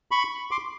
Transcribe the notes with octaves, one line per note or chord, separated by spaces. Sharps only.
B5 C#6
C6 D6